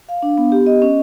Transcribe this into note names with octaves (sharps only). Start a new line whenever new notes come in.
F5
D4
B3
G4
D#5
C#4